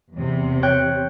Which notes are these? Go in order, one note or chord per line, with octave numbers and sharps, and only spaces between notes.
E2 C3
C#5 G5 F#6